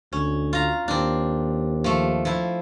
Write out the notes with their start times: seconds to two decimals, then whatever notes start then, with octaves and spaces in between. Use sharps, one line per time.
0.13 D2 C#4
0.53 F4 A#5
0.88 D#2 C4 D4
1.84 F3 A3
2.25 F3 E4